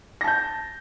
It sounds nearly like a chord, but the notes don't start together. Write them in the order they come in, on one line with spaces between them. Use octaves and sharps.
A#6 A5 G6